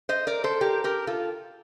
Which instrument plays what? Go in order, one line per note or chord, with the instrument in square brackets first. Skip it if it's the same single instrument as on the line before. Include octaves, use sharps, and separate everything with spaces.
[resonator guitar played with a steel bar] C5 D#5
A#4 D5
A4 C5
G4 A#4
G4 A#4
F4 A4